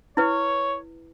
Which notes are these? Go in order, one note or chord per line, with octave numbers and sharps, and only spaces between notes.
E4 B4 C#5